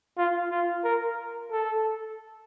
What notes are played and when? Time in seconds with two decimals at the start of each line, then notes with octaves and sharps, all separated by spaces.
0.18 F4
0.51 F4
0.84 A#4
1.51 A4